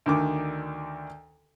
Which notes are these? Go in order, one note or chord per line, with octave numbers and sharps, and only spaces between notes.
D2 D3 D#3 D6